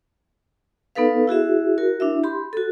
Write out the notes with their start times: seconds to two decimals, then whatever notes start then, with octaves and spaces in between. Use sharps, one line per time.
0.95 B3 D#4 A4 B4 F5
1.27 E4 F#4 G#4 E5
1.78 F#4 A#4
2.00 D4 E4 E5
2.23 G4 B5 C6
2.53 F#4 A4